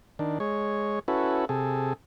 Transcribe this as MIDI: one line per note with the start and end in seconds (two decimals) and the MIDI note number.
0.19 0.39 51
0.19 0.39 62
0.40 0.99 56
0.40 0.99 73
1.08 1.45 61
1.08 1.45 64
1.08 1.45 66
1.08 1.45 69
1.08 1.45 71
1.49 1.93 48
1.49 1.93 68
1.49 1.93 69